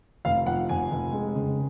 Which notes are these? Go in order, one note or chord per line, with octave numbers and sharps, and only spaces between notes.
F1 F5
F2 F#5
F1 G#5
F1
G#3
C#3